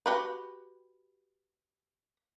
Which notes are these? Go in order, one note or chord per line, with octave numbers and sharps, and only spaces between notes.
F#4 G4 B4